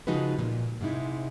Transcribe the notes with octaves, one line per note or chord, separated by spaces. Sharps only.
C#3 F3 G#3 D#4 F#4 B4
A#2
G#2 C3 G#3 D#4 E4